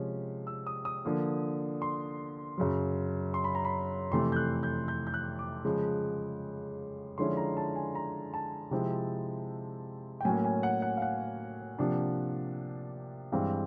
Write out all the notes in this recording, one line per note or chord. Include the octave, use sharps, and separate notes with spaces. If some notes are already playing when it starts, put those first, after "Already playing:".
Already playing: C3 F3 G#3 C#4
E6
D#6
D#6
D3 F3 A#3
C6
F#2 C#3 F#3
C6
B5
A#5
B5
F2 C3 E3 A3 C6
G6
F#6
G6
G6
G6
F#6
D6
C#3 F3 G#3
D3 F3 G#3 C#4 E4 C6
A#5
A5
G#5
A#5
A5
C3 F3 G#3 C4 E4
G5
A2 F#3 A#3 C#4 G#5
G#5
F#5
F#5
F5
F#5
C3 F3 A#3 D4
G2 E3 G#3 C4 F5